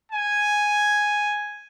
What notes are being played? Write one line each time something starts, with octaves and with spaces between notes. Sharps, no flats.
G#5